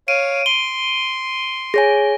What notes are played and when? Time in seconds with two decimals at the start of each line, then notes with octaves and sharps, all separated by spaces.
0.08 C#5 F5 D7 D#7
0.46 C6 G7
1.74 G#4 C#5 G#5 A#6